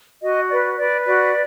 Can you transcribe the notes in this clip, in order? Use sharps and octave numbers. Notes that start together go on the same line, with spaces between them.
F#4 D#5
B4 D5
B4 D5
F#4 D5